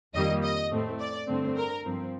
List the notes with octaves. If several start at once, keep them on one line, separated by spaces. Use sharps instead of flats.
F2 D#3 G3 A#3 D#5
D#5
A2 A3 C4
D5
G2 D3 A3 C4
A#4
G2 F3 C4